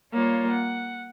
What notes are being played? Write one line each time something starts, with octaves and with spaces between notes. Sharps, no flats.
G3 A#3 F4 C#5
F#5